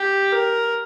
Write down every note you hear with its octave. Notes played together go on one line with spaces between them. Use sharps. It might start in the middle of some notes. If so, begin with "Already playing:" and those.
Already playing: G4
A#4